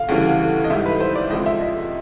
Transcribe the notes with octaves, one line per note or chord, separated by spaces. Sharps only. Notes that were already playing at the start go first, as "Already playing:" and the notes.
Already playing: F5
D2 C#3 E3 G3
D#5
G#2 E3 G3 E5
B4
C5
D5
C#2 C3 F3 G#3 D#5
E5
D#5